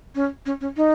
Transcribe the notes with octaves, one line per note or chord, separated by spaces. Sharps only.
C#4
C#4
C#4
D#4